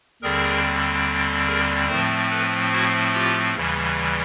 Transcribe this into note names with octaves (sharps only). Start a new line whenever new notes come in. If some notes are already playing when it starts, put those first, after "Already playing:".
D#2 D3 G3 C4 G#4 A#4
G#4 A#4
A2 F3 A3 C4 A#4 C5
A4 B4
E4 F#4
F4 G4
D#2 C#3 E3 G3